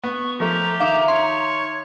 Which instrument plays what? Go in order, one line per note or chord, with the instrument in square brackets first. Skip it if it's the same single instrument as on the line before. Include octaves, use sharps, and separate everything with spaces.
[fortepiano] B3 [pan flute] C#6
[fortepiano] F3 A3 [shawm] G4 [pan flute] A#5
[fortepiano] D#3 [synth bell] E5 F5 D6
[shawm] C#5 [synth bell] C6